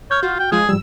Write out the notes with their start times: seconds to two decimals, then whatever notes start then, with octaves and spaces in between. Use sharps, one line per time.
0.11 C#5 F6 G6
0.23 F4 F#4
0.39 G5
0.52 F3 G#3 F4 G#4
0.69 G#2 F3 G3 E6